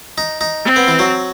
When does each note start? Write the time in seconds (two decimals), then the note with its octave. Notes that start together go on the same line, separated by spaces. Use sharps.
0.18 D#4
0.41 D#4
0.65 C4
0.76 B3
0.88 E3
0.99 F#3